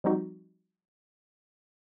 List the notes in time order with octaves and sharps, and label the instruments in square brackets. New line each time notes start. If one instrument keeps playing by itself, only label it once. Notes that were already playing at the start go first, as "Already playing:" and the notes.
[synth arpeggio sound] F3 G3 C4 D#4 F#4